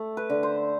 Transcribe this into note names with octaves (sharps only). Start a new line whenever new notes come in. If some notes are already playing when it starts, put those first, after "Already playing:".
Already playing: A3
B4
D3
C5